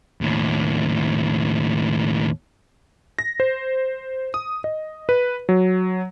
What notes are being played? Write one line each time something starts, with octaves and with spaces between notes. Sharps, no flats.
D#2 A2
A#6
C5
D#6
D#5
B4
F#3